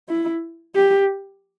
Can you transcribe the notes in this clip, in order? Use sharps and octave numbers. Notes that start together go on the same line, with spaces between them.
E4
G4